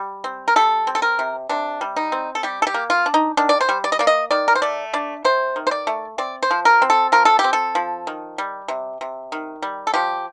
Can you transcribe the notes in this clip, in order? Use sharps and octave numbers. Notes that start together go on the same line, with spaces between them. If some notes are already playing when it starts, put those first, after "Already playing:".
Already playing: G3
C4
A#4
G3 A4
C4
A4
A#4
C3
C3 D4
G3
D#4
C4
A4
G3 G4
A4
G4
A#3
F4
D4
D#4
D#3 D4
D5
C5
G3
D5
D#5
A#3 D5
D#5
D#3 D5
A#4
C5
A3 D5
D4 D5
C3 C5
D#3
C5
D5
A3
C4 D5
C5
F3
A#4
C4
A4
F3 A#4
A4
G4
C4
A4
F3
D#3
G3
C3
C3
D#3
G3
A4
F3 G4